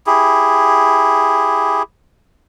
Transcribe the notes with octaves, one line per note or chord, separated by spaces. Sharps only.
E4 G4 G#4